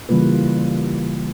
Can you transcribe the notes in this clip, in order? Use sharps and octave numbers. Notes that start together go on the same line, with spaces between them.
C#3 E3 G3 A#3 F4 B4